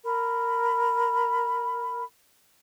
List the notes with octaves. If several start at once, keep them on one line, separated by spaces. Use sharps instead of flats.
A#4 B5